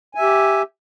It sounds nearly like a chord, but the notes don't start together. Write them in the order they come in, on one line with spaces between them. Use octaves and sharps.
G#5 E5 G4